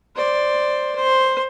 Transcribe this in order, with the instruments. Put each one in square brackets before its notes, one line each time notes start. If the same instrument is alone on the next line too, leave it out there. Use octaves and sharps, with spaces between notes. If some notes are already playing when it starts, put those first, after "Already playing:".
[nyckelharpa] C5 D5
C5